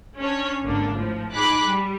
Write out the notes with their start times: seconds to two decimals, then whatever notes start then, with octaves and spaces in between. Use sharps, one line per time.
0.18 C#4 D4 C#5
0.63 G#1 D3 A#3 D4
0.94 A2 F3
1.33 D#4 G#4 B5 D6 F#6 B6
1.66 G3